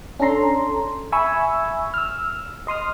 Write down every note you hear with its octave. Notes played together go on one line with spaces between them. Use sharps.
C#4 D4 A4 A#5 C6
E5 G#5 B5 C#6 E6
E6 F6
D#5 C6 D#6 F6